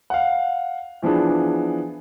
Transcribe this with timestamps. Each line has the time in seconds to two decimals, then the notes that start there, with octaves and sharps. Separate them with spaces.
0.10 F5 F#5
1.02 E3 F3 B3 D4 G#4